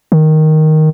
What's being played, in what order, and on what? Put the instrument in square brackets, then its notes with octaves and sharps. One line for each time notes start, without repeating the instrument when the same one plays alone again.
[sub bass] D#3